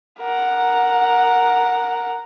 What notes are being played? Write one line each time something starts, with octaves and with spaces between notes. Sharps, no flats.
A#4 F#5